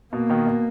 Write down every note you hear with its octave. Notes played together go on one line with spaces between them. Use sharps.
B2 A#3
B2 D#3
B2